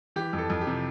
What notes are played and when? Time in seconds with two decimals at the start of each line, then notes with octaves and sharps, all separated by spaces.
0.16 E3 G4
0.33 F2
0.38 A4
0.50 F2
0.61 G4
0.67 C3